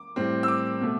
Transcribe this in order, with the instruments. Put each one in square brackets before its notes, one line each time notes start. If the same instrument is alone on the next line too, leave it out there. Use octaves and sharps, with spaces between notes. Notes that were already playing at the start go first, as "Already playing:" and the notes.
Already playing: [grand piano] D6
A2 G3 C4
E6
D6
B2 A3